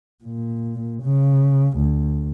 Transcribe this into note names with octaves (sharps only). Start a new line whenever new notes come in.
A#2
C#3
D2